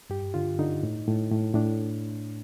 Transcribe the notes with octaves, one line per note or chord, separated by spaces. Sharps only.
G2 G4
D3 F4
D3 D#4
A2
A2
A2
A2 D4